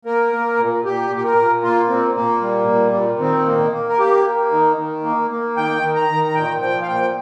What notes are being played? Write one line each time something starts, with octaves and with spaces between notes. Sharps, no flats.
A#3 A#4
A#3
A#2
A#2 G4
A#2
G4
A#4
A#2
A#3 F4
A#2 C4
A#2 A#3
G3
A#2
A#2
D#3 C4
A#3
A#3
A#4
A#3 G4
A#3
D#3
D#3
A#3
A#3
D#3 G5
D#3
A#5
D#3
A#5
A#2 G5
F3 G5
F5
A#2 G5